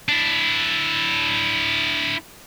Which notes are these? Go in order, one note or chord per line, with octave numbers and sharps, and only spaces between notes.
D4 E4